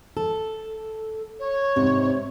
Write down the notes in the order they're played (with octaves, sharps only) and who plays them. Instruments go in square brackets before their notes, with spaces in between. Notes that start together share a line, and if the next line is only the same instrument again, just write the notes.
[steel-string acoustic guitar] A4
[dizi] C#5
[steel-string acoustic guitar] G#2 [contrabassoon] C3